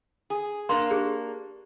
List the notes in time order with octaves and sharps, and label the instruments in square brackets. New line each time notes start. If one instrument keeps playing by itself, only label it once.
[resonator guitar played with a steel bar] G#4
[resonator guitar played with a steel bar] A#3 D4 [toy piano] C6
[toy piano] G4 G#4